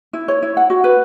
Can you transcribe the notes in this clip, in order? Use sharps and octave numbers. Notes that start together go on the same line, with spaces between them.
E4
C#5
E4
F#5
F#4
B4